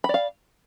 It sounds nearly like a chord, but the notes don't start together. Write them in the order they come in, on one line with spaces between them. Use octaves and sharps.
B5 D5 F5